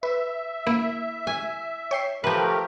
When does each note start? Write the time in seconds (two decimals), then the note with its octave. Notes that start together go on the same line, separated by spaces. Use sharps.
0.03 B4 E5
0.67 A#3 E4
1.27 G#5
1.91 C#5 G5 C7
2.24 F3 A3 G4 A#4 B4